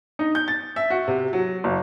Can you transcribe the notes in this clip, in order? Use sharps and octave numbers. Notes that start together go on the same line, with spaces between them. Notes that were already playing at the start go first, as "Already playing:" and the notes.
D#4
G6
A6
E5
F#4
C3
F#3
F#1